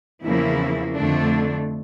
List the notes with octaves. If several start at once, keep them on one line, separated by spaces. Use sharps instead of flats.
E2 C#3 F3 A#3 E4
F2 D3 A3 D4